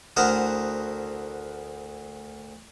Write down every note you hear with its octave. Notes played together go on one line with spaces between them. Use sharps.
D2 E4 A#4 C5 F#5 D#6